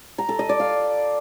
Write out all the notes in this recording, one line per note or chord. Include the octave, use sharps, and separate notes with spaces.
A#5
A4
D#5
D5
F5